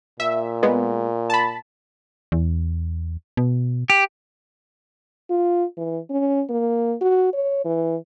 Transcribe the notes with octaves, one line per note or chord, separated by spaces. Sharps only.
A#2 E5
G#3 B3
A5 B5
E2
B2
G4
F4
E3
C#4
A#3
F#4
C#5
E3